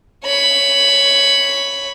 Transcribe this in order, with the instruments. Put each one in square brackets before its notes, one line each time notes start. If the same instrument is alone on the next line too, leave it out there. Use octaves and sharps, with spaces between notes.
[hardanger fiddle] C#5 B5